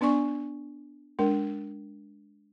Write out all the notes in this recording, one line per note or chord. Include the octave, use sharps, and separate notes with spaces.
B3 D4 D5 G#5 C#6
G#3 D4 A#4